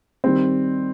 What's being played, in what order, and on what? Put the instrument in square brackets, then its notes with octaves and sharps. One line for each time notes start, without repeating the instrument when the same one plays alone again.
[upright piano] D#3 G3 C4